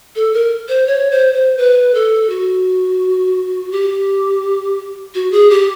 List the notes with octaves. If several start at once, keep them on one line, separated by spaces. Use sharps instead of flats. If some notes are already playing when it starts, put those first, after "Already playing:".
A4
A#4
C5
C#5
C5
C5
B4
A4
F#4
G4
F#4
G#4
G4